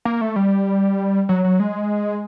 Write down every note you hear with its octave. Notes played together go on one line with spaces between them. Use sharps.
A#3
A3
G3
F#3
F#3
G#3